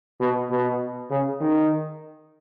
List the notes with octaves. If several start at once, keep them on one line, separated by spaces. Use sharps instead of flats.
B2
B2
C#3
D#3